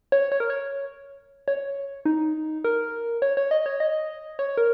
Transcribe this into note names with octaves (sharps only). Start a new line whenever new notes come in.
C#5
C#5
A#4
C#5
C#5
D#4
A#4
C#5
C#5
D#5
C#5
D#5
C#5
A#4